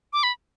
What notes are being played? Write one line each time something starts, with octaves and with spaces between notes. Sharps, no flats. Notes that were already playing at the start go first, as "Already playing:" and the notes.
D6
B5